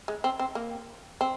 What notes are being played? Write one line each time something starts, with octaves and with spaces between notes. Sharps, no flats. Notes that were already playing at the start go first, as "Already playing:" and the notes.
G#3
C4
C4
A#3
C4